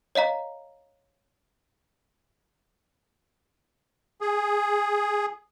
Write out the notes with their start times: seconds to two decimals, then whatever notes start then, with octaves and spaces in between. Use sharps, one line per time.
0.15 C#5 D#5 F5 A#5
4.21 G#4